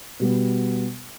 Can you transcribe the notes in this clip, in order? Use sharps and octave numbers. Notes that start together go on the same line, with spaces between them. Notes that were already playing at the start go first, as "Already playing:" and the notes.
B2 G3 B3